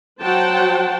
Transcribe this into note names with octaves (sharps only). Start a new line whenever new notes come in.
F#3 C5 F#5 G5 A5